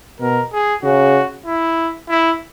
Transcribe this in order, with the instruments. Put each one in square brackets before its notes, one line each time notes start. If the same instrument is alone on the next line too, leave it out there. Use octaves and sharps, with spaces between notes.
[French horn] B2 [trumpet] A#4
[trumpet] G#4
[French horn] C#3 [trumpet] F#4
[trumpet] E4
E4